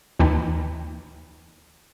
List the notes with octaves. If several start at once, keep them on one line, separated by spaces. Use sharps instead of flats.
D#2 E3 D#4 G5 A5 B5